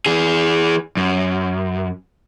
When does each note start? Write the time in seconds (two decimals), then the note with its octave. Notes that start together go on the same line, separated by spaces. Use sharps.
0.06 E3 G#4
0.97 F#2